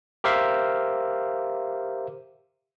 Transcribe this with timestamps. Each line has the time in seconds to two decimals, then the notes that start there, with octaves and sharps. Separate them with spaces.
0.24 G4 A#4 C5 E5 F5